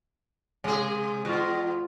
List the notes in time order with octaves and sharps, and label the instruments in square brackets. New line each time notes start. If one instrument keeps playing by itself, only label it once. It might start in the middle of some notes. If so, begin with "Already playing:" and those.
[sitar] C3 G#4 [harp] G#3
[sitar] E2 [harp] F4 F#4